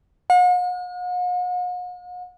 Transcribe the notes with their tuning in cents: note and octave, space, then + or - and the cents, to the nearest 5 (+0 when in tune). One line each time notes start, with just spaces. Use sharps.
F#5 -45